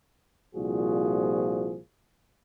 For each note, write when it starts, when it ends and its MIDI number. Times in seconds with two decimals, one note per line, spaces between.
0.55 1.78 36
0.55 1.78 46
0.55 1.78 53
0.55 1.78 66
0.55 1.78 68